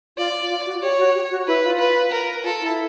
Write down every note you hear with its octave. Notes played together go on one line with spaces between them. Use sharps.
F4 D5
F4
F#4
G4 C#5
F#4
G4
F#4
E4 B4
F4
B4
A#4
F4 A4
E4